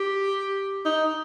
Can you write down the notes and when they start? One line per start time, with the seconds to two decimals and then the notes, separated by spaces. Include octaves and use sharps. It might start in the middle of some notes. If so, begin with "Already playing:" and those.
Already playing: G4
0.85 D#4